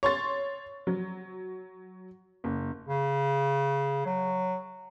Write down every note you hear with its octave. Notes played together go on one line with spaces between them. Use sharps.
C#5 C6 A6
F#3
F#1
C#3
F#3